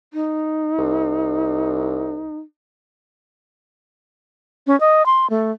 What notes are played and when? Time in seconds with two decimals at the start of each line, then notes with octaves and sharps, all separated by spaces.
0.13 D#4
0.79 C2
4.67 C#4
4.80 D#5
5.06 C6
5.30 A3